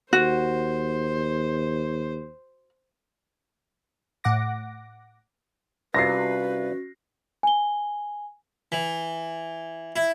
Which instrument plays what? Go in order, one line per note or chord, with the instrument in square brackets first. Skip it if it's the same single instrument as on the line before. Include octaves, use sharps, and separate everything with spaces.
[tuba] D#2 [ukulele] F#4 [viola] C5
[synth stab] A2 F#5 D6 A#6
[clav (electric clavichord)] C2 C3 F4 [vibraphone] C#4 F#4 [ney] B4 [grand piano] A#6 C7
[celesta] G#5 G7
[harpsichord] E3
E4